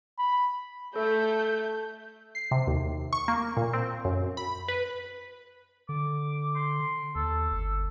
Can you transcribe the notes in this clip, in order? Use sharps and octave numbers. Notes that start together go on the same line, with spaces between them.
B5
A3 A4 G6
C7
C3
D#2
C#6
A#3
A#2
C4
F#2
B5
B4
D3 D6
C6
D#2 A4
G1